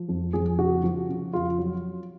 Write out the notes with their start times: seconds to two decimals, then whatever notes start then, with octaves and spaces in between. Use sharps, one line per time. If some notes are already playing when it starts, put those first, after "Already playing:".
Already playing: F3
0.09 F2
0.33 F2 G#4
0.58 C#3 F#4
0.84 F3
1.09 C#3
1.33 F2 F4
1.59 F#3